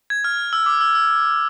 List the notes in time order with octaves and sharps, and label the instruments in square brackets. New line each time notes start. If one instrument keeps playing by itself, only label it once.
[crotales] G#6
F6
E6
D6
E6
E6